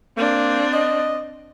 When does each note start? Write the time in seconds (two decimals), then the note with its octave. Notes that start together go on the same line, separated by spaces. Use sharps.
0.17 A#3 C4 D4
0.73 D#5